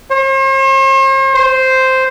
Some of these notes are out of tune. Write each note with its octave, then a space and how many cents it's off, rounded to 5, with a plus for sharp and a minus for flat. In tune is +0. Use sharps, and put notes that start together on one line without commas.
C5 +45
C5 -5